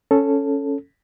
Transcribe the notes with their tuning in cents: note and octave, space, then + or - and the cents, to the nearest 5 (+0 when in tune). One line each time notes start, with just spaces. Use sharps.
C#4 +0 A4 +0